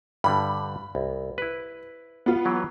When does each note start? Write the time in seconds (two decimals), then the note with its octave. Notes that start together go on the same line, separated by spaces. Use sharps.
0.24 G2 D3 G3 B5
0.95 C2
1.38 E4 B4
2.26 B3 F4
2.45 E3 F#3 G4